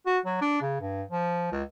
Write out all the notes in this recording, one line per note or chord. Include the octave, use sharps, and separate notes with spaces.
F#4
F#3
D4
C#3
G2
F3
C#2